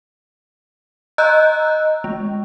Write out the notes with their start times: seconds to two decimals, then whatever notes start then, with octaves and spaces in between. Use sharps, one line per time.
1.18 D#5 A#5 E6 F#6 G6
2.04 G#3